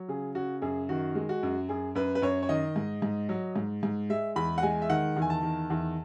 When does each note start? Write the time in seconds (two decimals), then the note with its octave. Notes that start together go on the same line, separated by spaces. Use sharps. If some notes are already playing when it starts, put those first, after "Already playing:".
Already playing: F#3
0.08 C#3 G#4
0.35 C#3 F#4
0.62 F#2 G#4
0.89 D#3 F#4
1.15 G#3
1.29 F#4
1.43 F#2
1.69 F#2 G#4
1.95 F#2 B4
2.15 B4
2.22 F#2 C#5
2.43 C#5
2.49 D#3 D#5
2.76 G#2
3.02 G#2
3.29 F#3
3.56 G#2
3.83 G#2
4.10 G#3 E5
4.36 E2 B5
4.58 F#5
4.63 G#3 G#5
4.82 E5
4.90 D#3 F#5
5.16 E2
5.22 G#5
5.30 A5
5.43 D#3
5.70 E2